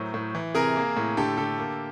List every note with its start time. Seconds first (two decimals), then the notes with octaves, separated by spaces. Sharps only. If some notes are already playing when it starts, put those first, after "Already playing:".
Already playing: A2 F#3 A#4 C5
0.14 A2
0.35 E3
0.55 C3 G#4 A#4
0.76 A#3
0.97 A2
1.17 D3 G4 A4
1.37 D3 G4 A4
1.58 A#3